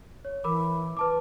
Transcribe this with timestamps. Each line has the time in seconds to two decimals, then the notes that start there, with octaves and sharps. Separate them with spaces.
0.25 C#5
0.44 E3 A#4 B5 D6
0.97 B4 A5 D6